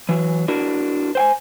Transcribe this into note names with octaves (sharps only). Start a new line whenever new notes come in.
E3 F#3
D4 E4 F#4 A#4
C5 G5 G#5